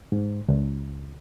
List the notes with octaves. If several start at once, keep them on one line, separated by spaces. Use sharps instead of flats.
G#2
C#2